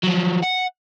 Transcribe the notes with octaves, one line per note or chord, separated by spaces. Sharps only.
F3 F#3
F#5